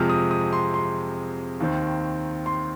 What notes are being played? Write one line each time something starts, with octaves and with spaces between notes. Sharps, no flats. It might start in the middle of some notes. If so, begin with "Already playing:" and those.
Already playing: F2 C3 F3 G#3 F6
D#6
D#6
C6
C6
D#2 D#3 C4
C6